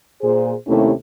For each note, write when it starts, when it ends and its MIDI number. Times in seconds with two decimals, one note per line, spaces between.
0.21 0.53 46
0.21 0.53 68
0.21 0.53 72
0.67 0.91 39
0.67 0.91 48
0.67 0.91 57
0.67 0.91 61
0.67 0.91 64
0.67 0.91 67